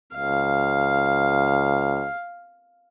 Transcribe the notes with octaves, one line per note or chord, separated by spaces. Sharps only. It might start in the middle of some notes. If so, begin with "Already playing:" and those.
C#2 F5